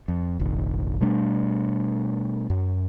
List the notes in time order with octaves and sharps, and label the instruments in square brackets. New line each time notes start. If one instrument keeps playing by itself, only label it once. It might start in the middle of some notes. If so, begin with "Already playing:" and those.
[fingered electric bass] F2
F1 A#1 D#3
B2 G3 A3 D4
F#2